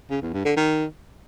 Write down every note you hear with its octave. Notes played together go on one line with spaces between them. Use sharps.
C#3
E2
G2
D3
D#3